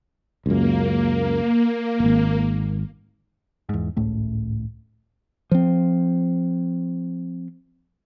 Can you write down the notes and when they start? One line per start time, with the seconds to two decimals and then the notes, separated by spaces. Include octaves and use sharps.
0.46 C#2 F#2 A#3
2.00 D#1 G#1
3.69 E2 G#2
3.96 G#1 C#2 A2 A3
5.51 F3 C4